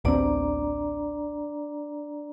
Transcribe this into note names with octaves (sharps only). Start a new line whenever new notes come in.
A1 D2 C4 D4 D5 A#5